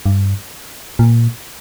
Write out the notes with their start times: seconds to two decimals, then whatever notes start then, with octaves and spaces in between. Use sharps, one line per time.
0.06 G2
0.99 A#2